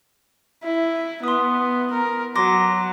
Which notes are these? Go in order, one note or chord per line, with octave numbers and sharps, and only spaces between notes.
E4
B3 C6 D#6
A#4
F#3 C6 D6 A#6